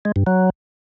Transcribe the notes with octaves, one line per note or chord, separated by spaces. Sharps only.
G#3
G2
F#3